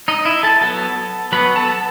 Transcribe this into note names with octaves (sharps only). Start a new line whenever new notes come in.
D#4 D#5
E4 E5
A4 A5
F#3 B3 A4 A5
F#3 B3 B4 B5
A4 A5